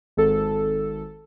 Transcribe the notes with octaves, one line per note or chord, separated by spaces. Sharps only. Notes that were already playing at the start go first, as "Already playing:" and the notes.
G#1 A4